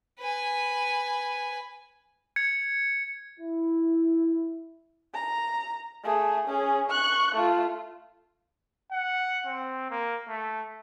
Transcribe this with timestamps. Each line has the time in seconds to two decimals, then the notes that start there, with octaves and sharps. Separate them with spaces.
0.20 B4 G#5
2.36 G#6 C#7
3.39 E4
5.14 A#5
6.04 A3 G#4
6.47 C#4 G#4
6.90 C#6 F#6
7.35 A3 F4
8.92 F#5
9.46 C4
9.90 A#3
10.28 A3